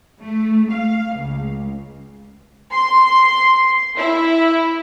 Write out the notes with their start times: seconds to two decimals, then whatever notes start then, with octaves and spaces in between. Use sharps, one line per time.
0.21 A3
0.73 F5
1.16 C#2
2.72 C6
3.97 E4